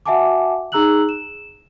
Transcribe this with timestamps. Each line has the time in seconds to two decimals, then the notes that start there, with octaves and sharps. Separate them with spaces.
0.06 F#4 E5 F#5 G#5 A5 D6
0.72 D#4 G#4 A#5 E6 F#6 F#7
1.09 E7